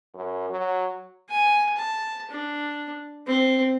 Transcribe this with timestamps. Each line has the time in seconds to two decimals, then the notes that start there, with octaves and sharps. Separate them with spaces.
0.15 F#2
0.50 F#3
1.30 G#5
1.77 A5
2.30 D4
3.27 C4